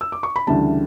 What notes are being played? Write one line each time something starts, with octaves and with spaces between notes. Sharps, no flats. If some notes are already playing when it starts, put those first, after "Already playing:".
E6
D6
C#6
B5
D2 C#3 E3 G3 D4 A5